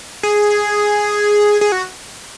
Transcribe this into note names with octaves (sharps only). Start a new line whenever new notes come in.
G#4
G#4
F#4